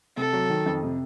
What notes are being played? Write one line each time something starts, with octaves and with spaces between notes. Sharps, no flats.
C3 A4
F#3
D#3
F2
C3